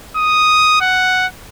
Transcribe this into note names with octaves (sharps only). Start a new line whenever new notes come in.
D#6
F#5